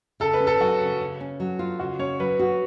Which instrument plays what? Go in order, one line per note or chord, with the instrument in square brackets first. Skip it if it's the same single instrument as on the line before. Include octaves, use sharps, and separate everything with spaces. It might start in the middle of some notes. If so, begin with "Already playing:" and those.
[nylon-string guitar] C#3 [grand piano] A4
[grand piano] B4
[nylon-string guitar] C#4
[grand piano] A4
[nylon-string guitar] F#3 [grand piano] F#4
[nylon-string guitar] C#3
C#3
C#4
F#3
F4
[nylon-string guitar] C#3 [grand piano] F#4
[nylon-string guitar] C#4 [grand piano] C#5
[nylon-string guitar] F#3 [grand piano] B4
[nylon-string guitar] F#4